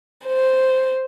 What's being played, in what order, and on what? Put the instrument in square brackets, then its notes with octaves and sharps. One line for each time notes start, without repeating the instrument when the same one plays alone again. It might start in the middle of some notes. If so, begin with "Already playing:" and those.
[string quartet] C5